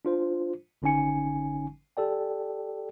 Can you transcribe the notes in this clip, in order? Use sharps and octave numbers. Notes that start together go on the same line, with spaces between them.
D4 F4 C5
G#1 D3 C#4 D#4 G#5 C#7
G4 A4 D5 G5